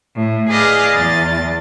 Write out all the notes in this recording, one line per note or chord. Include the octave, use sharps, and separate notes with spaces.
A2
G#4 B4 D5 D#5 F5
E2 A6